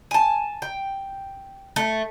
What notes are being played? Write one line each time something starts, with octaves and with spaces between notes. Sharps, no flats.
G#5 A5
G5
A3